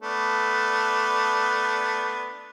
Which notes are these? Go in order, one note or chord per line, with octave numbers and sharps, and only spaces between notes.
A3 B3 D4